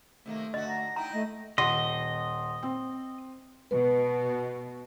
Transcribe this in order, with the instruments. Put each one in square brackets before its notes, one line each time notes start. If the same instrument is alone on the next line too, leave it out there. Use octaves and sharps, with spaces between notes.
[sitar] C3 D#3 A#3 [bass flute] A3
[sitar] D3 F#4 [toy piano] D#5
[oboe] A#5
[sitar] D#4 E4 [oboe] G5 [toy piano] A#5
[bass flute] A3 [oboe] D#5
[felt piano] D#1 F#5 C6 [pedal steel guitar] D#5
[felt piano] C4
[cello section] B2 [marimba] B4